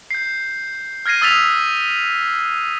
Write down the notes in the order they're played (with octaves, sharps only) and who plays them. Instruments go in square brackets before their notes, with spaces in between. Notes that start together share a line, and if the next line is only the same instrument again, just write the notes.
[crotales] G6 C7
F6 G#6 A#6 C7 D#7
D#6 E6 A6 B6 F7